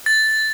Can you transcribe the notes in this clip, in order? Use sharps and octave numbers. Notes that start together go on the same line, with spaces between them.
A6